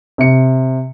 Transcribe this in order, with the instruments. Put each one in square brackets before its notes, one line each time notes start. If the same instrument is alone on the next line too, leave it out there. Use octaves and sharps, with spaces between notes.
[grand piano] C3 C#7